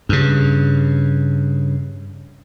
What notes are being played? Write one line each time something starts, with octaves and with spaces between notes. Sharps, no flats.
G2 C#3